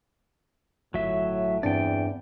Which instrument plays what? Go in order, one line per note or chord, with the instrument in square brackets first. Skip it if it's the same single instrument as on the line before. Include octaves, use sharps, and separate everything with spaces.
[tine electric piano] G1 [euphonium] A2 [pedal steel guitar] F#3 E5
[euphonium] E2 [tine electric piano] G2 C4 D4 [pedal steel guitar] D5 G5